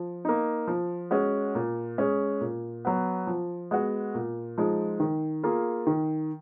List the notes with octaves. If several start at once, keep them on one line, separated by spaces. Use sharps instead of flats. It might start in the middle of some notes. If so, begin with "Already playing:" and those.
Already playing: F3
A#3 D#4
F3
G#3 C#4 F#4
A#2
G#3 C#4 G#4
A#2
F#3 B3
F3
G#3 B3 F#4
A#2
F3 G#3 D#4
D#3
A#3 F4 G#4
D#3